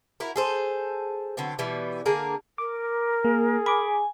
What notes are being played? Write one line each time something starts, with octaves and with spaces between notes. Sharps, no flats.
E4 F#4 A#4
G#4 A4 C5
D3 F#3 B3 C4
B2 E3 G3 B3
D3 A#3 G#4 A#4
A#4 D6
A#3 G#4
G#5 B5 D6